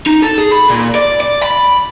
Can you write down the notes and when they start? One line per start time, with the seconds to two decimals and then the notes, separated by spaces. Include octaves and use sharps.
0.06 D#4
0.22 A4
0.38 G#4
0.51 B5
0.70 A#2
0.95 D5
1.20 D5
1.43 B5